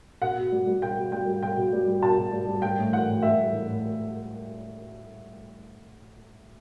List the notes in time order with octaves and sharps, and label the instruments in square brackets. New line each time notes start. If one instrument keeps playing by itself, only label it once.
[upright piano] B2 F#5
B2
G3
G3
B2 G5
B2
G3 G5
G3
B2 G5
B2
G3
G3
B2 A5
B2
G3
G3
G3 G5
A2
E3 F#5
A2
G3 E5
A2
E3
A2